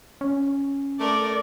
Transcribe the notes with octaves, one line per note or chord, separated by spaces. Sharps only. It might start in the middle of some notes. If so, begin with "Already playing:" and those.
C#4
A3 A#4 D5